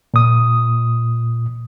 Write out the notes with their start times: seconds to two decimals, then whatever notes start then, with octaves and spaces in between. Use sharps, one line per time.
0.14 A#2 D#6